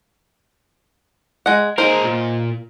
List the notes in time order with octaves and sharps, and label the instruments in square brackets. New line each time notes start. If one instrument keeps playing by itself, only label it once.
[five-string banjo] G#3 F#5
[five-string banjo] A#3 D#4 C5 [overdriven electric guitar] G#4 A#4
[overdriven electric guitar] A#2